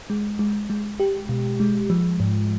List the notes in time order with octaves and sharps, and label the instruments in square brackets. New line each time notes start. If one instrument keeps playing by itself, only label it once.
[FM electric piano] G#3
G#3
G#3
G4
B2
G#3
F3
G#2